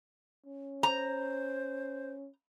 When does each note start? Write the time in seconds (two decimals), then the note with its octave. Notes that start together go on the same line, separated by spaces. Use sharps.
0.45 C#4
0.83 C5 A#5